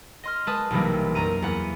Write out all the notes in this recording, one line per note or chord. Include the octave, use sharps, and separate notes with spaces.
D#5 C6 F6
G#3 B4 A5 D#6
B1 C3 E3 G3 A#3
F#2 A#5 D#7
E2 F#5